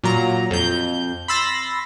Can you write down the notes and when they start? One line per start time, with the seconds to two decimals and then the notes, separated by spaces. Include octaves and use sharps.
0.03 A#2 F#3 A#5
0.51 F2 G6
1.28 B5 C6 E6 A6 A#6